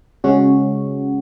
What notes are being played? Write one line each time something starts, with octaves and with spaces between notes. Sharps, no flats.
C#3 G#3 C#4 F#4